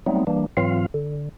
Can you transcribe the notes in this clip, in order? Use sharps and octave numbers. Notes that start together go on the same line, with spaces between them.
F#3 G3 A3 B3 C4 D#4
E3 G3 A#3 D4
G#2 E3 F#3 C4 F4 F5
D3